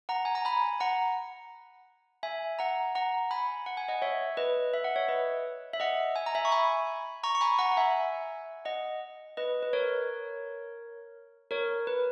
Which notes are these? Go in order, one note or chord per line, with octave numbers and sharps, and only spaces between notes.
F#5 A#5
G#5
A#5
G#5 B5
F#5 A#5
E5 G#5
F#5 A#5
F#5 A#5
G#5 B5
F#5
G#5
D#5 F#5
C#5 E5
B4 D#5
E5
F#5
C#5 E5
B4 D#5
E5
D#5 F#5
G#5
A#5
E5 G#5
C#6
G#5 B5
A#5 C#6
C#6
G#5 B5
F#5 A#5
F#5
E5 G#5
D#5 F#5
B4 D#5
B4
A#4 C#5
A#4 C#5
B4